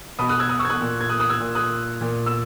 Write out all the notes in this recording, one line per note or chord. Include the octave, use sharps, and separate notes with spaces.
B2 B5 D#6
D#6 F#6
E6 G#6
D#6 F#6
C#6 E6
G#6
D#6 F#6
A#2
G#6
D#6 F#6
D#6 F#6
E6 G#6
A#2
D#6 F#6
A#2
E6